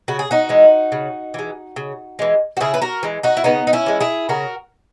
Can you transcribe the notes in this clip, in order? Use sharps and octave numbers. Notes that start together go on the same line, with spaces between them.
C#3 F#4
G#4
D#4 F#4
E3 G#3
C#3
E3 G#3
C#3
E3 G#3
F#4
C#3 E4 G#4
B4
F#4 A#4
E3 G#3
D#4 F#4
E4
C#3 B3 D#4
D#4
C#4 E4
E3 G#3
E4 G#4
C#3 F#4 A#4